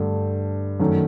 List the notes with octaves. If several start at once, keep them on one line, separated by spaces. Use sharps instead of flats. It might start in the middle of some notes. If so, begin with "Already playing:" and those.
Already playing: G2 D3 A3
F#2 D#3 F#3 A3